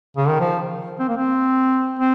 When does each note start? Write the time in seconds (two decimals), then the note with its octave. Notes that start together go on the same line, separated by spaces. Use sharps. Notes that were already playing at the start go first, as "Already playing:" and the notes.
0.17 C#3
0.29 D#3
0.40 F3
1.00 C4
1.09 A#3
1.17 C4
1.99 C4